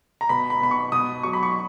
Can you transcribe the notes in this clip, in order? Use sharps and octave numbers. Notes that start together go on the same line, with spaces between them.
A#5
B2 B5
B5
B2 B5
C#6
B2 D#6
F#3 C#6
B5
C#6